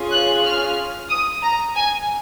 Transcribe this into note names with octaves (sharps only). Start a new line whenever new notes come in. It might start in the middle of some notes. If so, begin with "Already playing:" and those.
Already playing: C#4 F4 G#4
F#6
F6
D#6
A#5
G#5